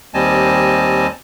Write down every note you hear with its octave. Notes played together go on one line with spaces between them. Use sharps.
D#2 G3 C4 D#5 G#5 A5